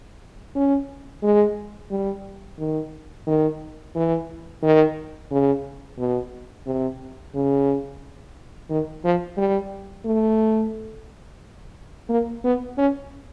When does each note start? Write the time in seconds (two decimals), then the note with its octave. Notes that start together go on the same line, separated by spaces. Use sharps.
0.55 C#4
1.23 G#3
1.91 G3
2.59 D#3
3.27 D#3
3.95 E3
4.62 D#3
5.31 C#3
5.98 B2
6.66 C3
7.34 C#3
8.70 D#3
9.04 F3
9.37 G3
10.05 A3
12.09 A#3
12.44 B3
12.77 C#4